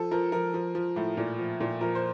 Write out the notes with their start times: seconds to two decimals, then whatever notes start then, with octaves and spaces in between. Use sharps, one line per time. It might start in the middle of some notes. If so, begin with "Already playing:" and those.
Already playing: F3 A4
0.11 F3 A#4
0.32 F3 A#4
0.54 F3
0.75 F3
0.96 A2
1.17 A#2
1.39 F3
1.60 A#2
1.81 F3 A#4
1.95 C5